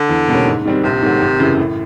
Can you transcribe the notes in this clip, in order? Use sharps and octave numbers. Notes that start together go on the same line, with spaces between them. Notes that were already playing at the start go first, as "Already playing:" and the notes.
Already playing: D3
E2
B2 G3 A#3 C#4
G#2
D#3 G3 C4
A#1 C3
G#2 D#3 F#3 A3
G#1
F#2 C#3 E3
A2